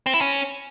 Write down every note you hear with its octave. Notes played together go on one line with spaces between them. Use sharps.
C4
E4
C#4